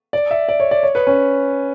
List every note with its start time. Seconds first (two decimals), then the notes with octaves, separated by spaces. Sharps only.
0.13 D5
0.31 E5
0.49 D5
0.60 C#5
0.71 D5
0.83 C#5
0.95 B4
1.07 C#4